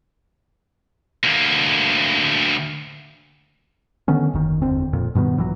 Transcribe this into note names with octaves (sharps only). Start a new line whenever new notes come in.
D2 A#3
D3 D#3 B3 C#4
F#1 D#2 D#3
F#1 E2 D3 C4
D#1 F2 A#2
G2 B2 D#3 B3
A#1 E3 F#3